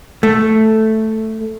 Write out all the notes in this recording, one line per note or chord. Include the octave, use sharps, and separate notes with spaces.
A3